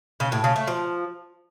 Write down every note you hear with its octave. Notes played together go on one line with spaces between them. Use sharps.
C#3
A2
C#3
A3
F3